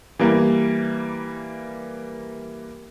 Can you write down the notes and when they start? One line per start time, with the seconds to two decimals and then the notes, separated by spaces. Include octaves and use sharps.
0.19 E3 G3 A#3